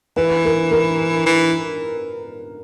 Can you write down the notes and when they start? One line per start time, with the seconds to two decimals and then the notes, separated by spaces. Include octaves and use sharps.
0.17 E3 B4
0.45 A#4
0.71 A#4
1.26 E3